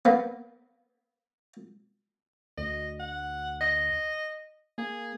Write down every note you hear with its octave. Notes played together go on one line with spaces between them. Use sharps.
A#3 B3
D2 D#5
F#5
D#5
A#3 G#4